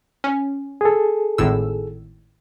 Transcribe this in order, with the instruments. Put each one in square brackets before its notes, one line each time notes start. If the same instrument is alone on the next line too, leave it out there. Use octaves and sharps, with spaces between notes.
[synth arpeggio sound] C#4
[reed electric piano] G#4 A4
[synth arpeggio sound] G#1 A2 E6